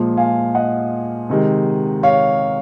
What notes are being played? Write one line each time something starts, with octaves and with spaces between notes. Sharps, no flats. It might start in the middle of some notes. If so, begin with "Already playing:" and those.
Already playing: A#2 F3 G#3
F5 G#5
D#5 F#5
C3 D#3 G#3
C#5 F5